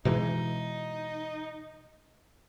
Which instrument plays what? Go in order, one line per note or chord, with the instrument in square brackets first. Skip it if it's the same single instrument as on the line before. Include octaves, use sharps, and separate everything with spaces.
[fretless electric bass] B2 E3 G#3 [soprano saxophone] D#4